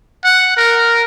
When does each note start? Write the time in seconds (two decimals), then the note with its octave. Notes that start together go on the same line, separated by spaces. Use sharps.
0.24 F#5
0.57 A#4